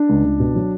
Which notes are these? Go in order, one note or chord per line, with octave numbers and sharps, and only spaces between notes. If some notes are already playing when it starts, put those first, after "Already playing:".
Already playing: D4
C#2
C#2
B2
F#3